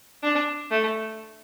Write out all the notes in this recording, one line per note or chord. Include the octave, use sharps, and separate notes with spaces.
D4
A3